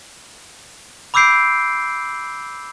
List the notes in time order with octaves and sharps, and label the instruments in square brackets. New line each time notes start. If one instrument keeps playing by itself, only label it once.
[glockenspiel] B5 D6 E6 G6 C7 D7